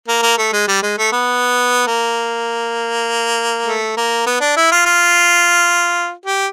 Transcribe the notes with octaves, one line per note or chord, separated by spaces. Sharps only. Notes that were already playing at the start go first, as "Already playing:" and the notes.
A#3
A#3
A3
G#3
G3
G#3
A3
B3
A#3
A3
A#3
B3
D4
E4
F4
F4
G4